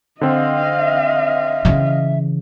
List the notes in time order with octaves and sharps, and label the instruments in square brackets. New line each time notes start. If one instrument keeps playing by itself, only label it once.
[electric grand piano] D3 C4 [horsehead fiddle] D#5 F5
[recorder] E5
[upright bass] C#3 E3